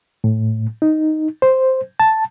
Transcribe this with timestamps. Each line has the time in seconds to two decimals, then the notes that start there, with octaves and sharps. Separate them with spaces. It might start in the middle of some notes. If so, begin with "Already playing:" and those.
0.24 A2
0.82 D#4
1.42 C5
2.00 A5